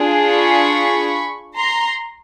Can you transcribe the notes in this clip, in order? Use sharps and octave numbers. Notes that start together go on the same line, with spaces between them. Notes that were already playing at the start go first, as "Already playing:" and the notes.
Already playing: D4 F4 G#4
B5 C#6
A#5 C6